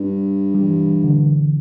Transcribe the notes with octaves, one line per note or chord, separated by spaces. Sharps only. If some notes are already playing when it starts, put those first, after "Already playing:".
Already playing: G2
G3
E3
D3